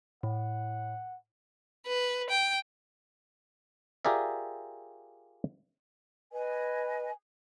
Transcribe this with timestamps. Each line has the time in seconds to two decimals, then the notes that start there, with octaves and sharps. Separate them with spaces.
0.23 A2 F#5
1.87 B4
2.30 G5
4.05 F4 G4 G#4 A#4 D5 E5
6.32 B4 D#5 G#5